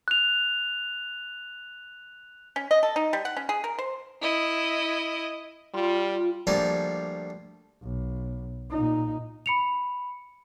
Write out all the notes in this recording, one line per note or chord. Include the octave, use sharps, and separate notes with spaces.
F#6 F7
C#4
D#5
A4
D#4
G3
F#5
C#4
G#4
A#4
C5
E4 D#5
G3 F4
D2 F3 G3 A#3 D5 G#5
B1
A#2 D#4
B5 C#7 F7